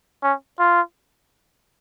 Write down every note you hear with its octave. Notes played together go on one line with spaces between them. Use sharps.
C#4
F4